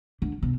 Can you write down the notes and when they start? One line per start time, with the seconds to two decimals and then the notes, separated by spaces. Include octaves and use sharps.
0.22 D3
0.42 B2